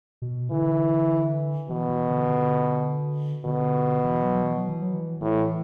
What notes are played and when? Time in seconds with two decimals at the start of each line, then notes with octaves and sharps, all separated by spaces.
0.22 B2
0.51 D3 E3
1.69 B2 E3
1.89 E3
2.08 D3
2.27 D3
3.45 B2 D3
4.04 E3
4.23 F#3
4.42 E3
4.56 F#3
4.69 E3
4.82 F#3
4.94 E3
5.21 A2 E3